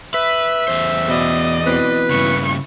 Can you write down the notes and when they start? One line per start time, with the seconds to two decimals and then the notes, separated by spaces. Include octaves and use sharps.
0.14 B4 E5
0.68 E2 C5
1.08 B2 D5 D#5
1.66 B2 E3 C4 B4
2.11 G2 C#3 E4 C#6